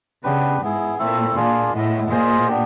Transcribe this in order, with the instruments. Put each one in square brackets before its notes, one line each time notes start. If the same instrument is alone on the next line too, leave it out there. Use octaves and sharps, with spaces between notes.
[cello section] C#3 [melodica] B3 D4 G4 B4
[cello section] G#2 [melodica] B3 E4 G#4
[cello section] A#2 [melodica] A3 C4 E4 A4
[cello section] A#2 [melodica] A#3 D4 F4 G#4
[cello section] A2 [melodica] G#3 B3 E4
[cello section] A#2 [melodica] F4 G#4 C5 D#5
[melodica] B3 D4 G4